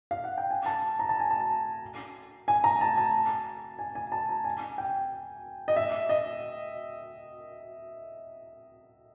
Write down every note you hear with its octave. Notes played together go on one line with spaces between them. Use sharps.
F5
F#5
G5
G#5
A5
A#5
A5
G#5
A5
G#5
A#5
A5
A5
G#5
G#5
A5
A#5
G#5
G5
D#5
E5
D#5